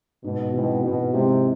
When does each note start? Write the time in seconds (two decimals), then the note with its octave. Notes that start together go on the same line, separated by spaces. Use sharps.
0.24 G#2 B2
0.53 B2 E3 G#3 C4
0.83 G#2 B2
1.13 C3 E3 G#3 C4